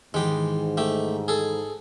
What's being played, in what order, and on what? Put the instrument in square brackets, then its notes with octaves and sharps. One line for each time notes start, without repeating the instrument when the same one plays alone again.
[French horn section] G#2 [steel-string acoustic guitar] D#3 E3 [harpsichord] G#3 G4
[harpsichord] A3 G4
G#4 A4